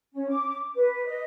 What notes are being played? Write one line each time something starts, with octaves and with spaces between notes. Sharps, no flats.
C#4
D6
B4
D#5